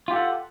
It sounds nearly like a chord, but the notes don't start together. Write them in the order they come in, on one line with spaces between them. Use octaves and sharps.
F4 G4 A4 F#5